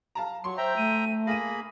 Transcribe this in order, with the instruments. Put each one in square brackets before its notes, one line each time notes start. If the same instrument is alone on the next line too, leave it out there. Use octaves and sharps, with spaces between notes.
[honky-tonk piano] F5 A5 A#5
[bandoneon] F#3 [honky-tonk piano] C6 [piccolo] C#6
[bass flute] C5 [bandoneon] E5 G5 A#5 [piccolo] G6
[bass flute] A3 [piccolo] D#7
[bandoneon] A#3 G#4 B5 [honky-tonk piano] F5 D#7 [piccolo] A#6